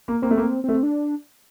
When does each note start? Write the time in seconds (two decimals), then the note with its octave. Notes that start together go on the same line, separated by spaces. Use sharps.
0.08 A#3
0.22 A#3 C4
0.31 A3
0.38 A#3
0.43 C4
0.64 A3 C4
0.83 D4